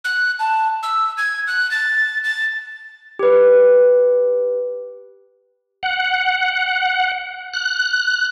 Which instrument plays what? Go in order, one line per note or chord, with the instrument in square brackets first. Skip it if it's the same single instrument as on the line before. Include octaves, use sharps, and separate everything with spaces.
[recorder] F#6
A5
E6
G#6
F#6
A6
A6
[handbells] G4 B4
[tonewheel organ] F#5
F#6